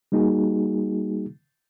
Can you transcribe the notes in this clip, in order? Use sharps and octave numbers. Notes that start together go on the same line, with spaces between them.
G3 A#3 D#4 F#4 G#4